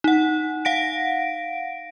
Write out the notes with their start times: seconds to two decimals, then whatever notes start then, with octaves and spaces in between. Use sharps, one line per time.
0.04 D#4 F#5
0.65 F5 F#5 A#6 D7